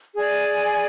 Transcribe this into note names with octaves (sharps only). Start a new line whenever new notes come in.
G#4 D5 G#5